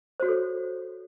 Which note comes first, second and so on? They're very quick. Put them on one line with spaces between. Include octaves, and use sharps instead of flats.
C5 F#4 C#5 A4